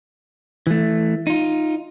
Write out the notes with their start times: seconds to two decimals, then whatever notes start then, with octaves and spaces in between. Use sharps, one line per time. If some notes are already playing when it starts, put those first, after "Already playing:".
0.67 E3 A3
1.27 D#4 F4